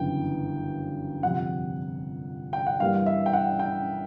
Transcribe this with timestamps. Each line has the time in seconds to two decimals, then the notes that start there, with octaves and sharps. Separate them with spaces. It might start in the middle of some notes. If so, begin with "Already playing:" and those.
Already playing: G1 F#2 C#3 E3 G5
1.23 G1 F2 C3 F#5
2.53 G5
2.67 F#5
2.80 G2 E3 G3 A#3 F5
3.06 E5
3.26 G5
3.33 F#5
3.59 G5